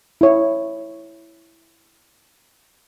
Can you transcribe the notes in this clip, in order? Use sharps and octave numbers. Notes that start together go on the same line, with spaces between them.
E4 C#5